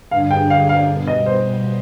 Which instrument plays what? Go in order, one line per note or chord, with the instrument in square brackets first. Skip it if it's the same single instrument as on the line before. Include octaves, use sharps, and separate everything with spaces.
[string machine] G2 D3 G3 D4 G#4 [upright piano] F5
[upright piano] G5
F5
F5
[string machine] B2 G3 B3
[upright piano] D#5
C5